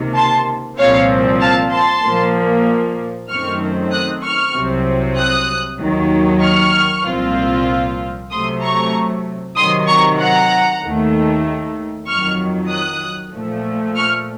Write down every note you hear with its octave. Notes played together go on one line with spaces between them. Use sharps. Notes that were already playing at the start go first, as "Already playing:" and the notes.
Already playing: C#2 C3 D#3 A#3
A5 C6
C2 A#2 F3 C4 C#5 F5
F5 A5
A5 C6
A#2 F3 A#3
F#2 D#3 A3 C4 C#6 F6
D#6 F#6
C#6 F6
C2 C3 F#3 C4
D#6 F#6
D#2 D#3 F#3
C#6 F6
C2 A#2 F3 C4 F4
C3 F#3 A3 C6 D#6
A#5 C#6
C3 D#3 F#3 C6 D#6
A#5 C#6
F#5 A#5
D#2 D#3 A3
F2 D#3 F#3 C#6 F6
D#6 F#6
A#2 F3 A3
C#6 F6